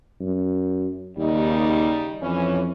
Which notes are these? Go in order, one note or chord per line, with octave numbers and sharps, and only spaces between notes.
F#2
D#2 C#3 G3 D#4
F2 E3 C#4